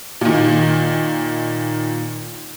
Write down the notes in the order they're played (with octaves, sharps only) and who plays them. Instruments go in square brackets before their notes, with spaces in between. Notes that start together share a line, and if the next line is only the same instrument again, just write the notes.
[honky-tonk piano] A#2 D#3